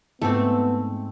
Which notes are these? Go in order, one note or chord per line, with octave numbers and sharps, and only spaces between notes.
G#2 A3 B3 C4